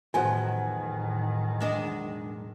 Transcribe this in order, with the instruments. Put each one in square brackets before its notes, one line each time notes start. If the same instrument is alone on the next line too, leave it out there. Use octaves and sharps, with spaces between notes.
[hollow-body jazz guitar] B1 E2 F3 [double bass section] A2 D#3 [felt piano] F#5 G#5
[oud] G#3 D4 D#5